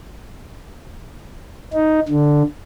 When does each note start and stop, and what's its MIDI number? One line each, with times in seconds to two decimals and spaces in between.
1.73 2.00 63
2.08 2.43 50